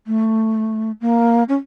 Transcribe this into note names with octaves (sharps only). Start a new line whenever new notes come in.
A3
A#3
C#4